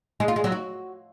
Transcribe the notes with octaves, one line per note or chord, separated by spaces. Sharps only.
G#3
F4
G#3
F#3
F#4